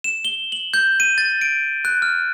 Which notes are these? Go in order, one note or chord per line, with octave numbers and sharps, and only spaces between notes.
E7
G7
F#7
G6
D#7
A6
D7
F#6
F6